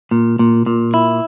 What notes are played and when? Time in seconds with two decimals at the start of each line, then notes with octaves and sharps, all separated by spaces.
0.11 A#2
0.39 A#2
0.66 A#2
0.94 E4